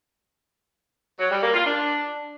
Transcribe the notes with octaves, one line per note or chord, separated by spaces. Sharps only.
F#3
G3
A#3
F4
D4